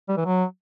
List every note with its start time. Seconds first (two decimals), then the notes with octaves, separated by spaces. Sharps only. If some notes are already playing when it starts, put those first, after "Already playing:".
0.08 G3
0.17 E3
0.25 F#3